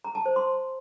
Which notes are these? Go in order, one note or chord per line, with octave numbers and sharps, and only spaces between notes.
A#5
A5
C5
C6